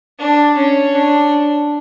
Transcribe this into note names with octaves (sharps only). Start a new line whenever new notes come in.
D4
C#4
D4